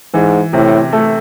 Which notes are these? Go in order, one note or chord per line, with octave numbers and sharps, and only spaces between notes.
G#2 E3
A2 C3
A3